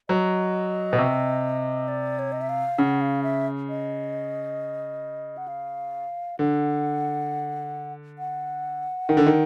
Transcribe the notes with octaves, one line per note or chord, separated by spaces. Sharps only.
F#3 D#5
B2
C3
D5
C#5
D#5
E5
F5
C#3 F#5
F5
E5
D#5
F#5
F5
D3 F#5
F#5
D#3
D3
D#3